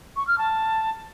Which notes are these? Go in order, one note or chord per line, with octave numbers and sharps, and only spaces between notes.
C#6
F6
A5